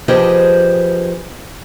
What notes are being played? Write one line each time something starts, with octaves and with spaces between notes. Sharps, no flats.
F3 G4 G#4 B4 C5 D#5